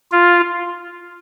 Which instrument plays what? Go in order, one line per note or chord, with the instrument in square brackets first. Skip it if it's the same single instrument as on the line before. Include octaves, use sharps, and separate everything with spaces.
[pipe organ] F4